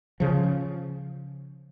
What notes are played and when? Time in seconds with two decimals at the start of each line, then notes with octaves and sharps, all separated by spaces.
0.20 C#3 F3